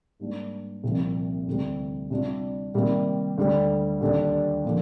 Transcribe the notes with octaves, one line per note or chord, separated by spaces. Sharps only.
G#2 G3 A#3 D4
C2 A#2 F3 C4
D2 C3 G3
C3 G3 D4 F4
C3 D#3 G3 A#3
D2 D3 G3
D#2 D3 G3 D4
D3 F3 A#3